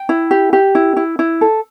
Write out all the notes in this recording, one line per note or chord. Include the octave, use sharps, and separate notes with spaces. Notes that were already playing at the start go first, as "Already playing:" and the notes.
Already playing: G5
E4
G4
G4
E4
E4
E4
A4